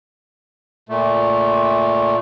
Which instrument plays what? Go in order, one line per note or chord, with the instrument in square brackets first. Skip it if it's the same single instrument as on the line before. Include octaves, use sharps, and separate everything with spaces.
[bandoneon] A#2 A3